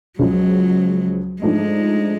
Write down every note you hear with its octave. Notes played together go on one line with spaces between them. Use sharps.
C#2 C#3 F3 F#3 G#3 C#4
G#2 F3 G#3 A3 D4